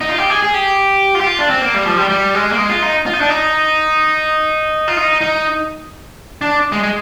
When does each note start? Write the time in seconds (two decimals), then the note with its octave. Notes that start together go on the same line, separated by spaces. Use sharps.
0.01 D#4
0.09 F4
0.18 G4
0.30 G#4
0.43 G#4
0.54 G4
1.15 F4
1.21 G4
1.27 F4
1.39 D4
1.50 C4
1.62 A#3
1.74 G3
1.86 F3
1.98 G3
2.09 G3
2.34 G#3
2.52 A#3
2.58 G#3
2.70 F4
2.82 D#4
3.06 F4
3.13 D#4
3.21 D4
3.30 D#4
4.88 F4
4.97 D#4
5.21 D#4
6.41 D4
6.72 G#3
6.83 G#3